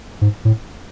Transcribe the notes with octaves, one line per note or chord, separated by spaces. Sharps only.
G#2
A2